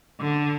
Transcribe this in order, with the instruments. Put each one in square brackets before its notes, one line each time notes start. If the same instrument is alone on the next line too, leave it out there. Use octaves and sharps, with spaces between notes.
[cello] D3